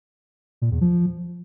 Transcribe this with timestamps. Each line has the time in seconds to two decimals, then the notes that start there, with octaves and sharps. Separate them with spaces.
0.62 A#2
0.71 E2
0.81 F3